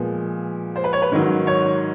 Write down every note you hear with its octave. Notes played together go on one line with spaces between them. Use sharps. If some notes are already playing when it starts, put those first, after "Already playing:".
Already playing: A#2 F3 G#3 B3
C5
B4
C#5
B4
G#2 D#3 F#3
C#5